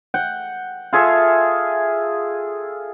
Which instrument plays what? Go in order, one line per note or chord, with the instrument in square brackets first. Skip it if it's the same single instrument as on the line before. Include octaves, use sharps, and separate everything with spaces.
[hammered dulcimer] F#5 G5
F4 G#4 A4 E5